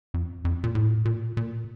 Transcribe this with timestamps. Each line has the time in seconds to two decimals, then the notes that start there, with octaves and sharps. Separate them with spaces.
0.14 F2
0.45 F2
0.64 A#2
0.75 A2
1.05 A#2
1.37 A#2